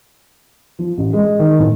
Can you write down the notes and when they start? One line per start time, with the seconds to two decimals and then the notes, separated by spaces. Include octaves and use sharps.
0.79 F3
0.98 A1
1.13 G#3
1.39 D#3
1.59 A2